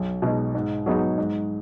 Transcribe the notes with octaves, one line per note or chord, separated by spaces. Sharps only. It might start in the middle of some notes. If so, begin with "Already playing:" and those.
Already playing: B1
B2 G#3 D#4
G#2
F#3 B3 D#4 G#4
G#2